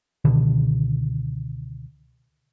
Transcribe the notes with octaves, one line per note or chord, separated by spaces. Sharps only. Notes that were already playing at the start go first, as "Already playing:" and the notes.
C#2 B2 D3 D#3